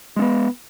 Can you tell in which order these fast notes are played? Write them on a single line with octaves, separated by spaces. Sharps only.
G#3 C4 B3